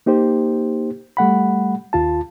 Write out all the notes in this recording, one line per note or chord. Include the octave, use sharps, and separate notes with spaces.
A#3 D#4 G4 C5
G3 A3 F#5 B5
D#2 F4 A5